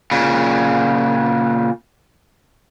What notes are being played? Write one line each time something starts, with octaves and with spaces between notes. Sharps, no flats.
A#2 C#3